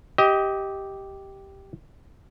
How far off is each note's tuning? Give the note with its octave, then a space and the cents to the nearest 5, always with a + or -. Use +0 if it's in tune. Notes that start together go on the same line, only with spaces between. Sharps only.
G4 -5 D#5 +20